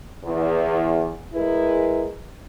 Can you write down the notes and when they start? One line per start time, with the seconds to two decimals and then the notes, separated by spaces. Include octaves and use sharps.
0.24 E2
1.34 G#3 E4 G#4 A#4 B4